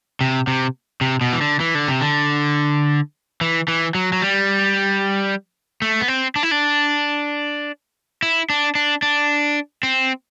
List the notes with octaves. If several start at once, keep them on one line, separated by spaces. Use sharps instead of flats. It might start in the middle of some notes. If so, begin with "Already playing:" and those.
C3
C3
C3
B2
E3
D3
E3
D3
C3
D3
E3
E3
F#3
F#3
G3
A3
B3
C4
D4
E4
D4
E4
D4
D4
D4
C4